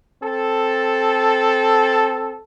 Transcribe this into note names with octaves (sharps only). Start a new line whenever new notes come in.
C4 A4